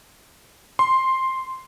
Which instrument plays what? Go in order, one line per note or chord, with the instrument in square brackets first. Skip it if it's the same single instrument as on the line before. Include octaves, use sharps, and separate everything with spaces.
[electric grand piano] C6